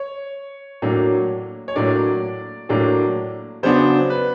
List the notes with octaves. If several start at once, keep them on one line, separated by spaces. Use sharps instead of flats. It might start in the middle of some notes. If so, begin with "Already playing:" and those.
Already playing: C#5
A2 F#3 A#3 D4
C#5
A2 F#3 A#3 D4 D5
A2 F#3 A#3 D4
C#3 F#3 B3 D4 C5
B4